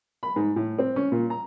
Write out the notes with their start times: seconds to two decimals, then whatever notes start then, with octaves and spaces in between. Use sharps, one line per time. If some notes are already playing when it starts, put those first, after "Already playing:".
0.23 B5
0.36 G#2
0.56 A2
0.79 C4
0.96 C#4
1.12 A#2
1.30 A#5